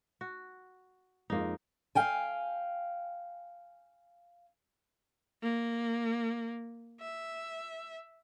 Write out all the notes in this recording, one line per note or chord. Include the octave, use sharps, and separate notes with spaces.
F#4
F2 G#3 A#3 D#4 F4
F5 G5 G#5
A#3
E5